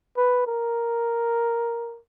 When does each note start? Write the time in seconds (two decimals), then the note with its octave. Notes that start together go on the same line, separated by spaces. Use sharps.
0.17 B4
0.47 A#4